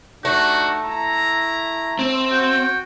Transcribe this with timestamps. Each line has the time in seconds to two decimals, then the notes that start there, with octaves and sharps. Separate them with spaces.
0.25 A3 D4 D#4 F#4
0.85 E4 A#5
1.99 C4
2.32 F#4 G5